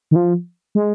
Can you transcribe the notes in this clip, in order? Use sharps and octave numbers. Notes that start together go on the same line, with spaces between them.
D#3
F3
G#3